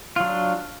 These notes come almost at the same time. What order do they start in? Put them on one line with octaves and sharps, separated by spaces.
F4 F#3 D4